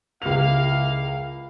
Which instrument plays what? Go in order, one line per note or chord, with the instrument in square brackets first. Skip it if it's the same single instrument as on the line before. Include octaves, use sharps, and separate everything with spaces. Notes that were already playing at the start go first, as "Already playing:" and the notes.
[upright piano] C#2 F7 [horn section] A#3 E4 F5